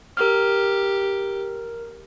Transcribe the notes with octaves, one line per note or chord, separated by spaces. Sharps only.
G4 A#4 F6